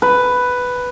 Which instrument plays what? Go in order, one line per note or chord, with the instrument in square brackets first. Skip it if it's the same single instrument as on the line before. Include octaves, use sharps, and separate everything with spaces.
[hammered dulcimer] B4